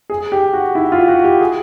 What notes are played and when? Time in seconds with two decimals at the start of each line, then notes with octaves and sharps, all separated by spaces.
0.10 G#4
0.32 G4
0.53 F#4
0.75 E4
0.92 F4
1.08 F#4
1.24 G4
1.41 G#4